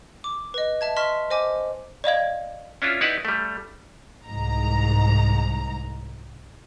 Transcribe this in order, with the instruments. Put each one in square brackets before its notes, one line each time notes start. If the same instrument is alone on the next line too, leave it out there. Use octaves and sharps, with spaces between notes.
[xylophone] D6
B4 D#5
E5 A5 G#6
D#5 A5 C6 C#6 F6 B6
C5 D#5 G#5 D6
D5 D#5 F5 G#6
[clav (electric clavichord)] C#4 D4 E4 F4
D#4 E4 G4 B4 D5 F#5
G3 A3
[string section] C2 G#2 A#5